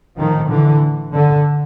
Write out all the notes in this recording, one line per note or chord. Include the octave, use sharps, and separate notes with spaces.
A2 D#3 F3
D3 E3
D3